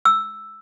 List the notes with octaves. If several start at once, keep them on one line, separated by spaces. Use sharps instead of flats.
E6